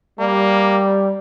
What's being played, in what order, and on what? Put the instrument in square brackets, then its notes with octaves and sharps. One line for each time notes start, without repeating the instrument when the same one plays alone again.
[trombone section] G3 [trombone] A#3